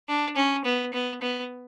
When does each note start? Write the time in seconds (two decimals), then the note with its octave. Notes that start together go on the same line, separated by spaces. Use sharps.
0.08 D4
0.36 C#4
0.65 B3
0.93 B3
1.22 B3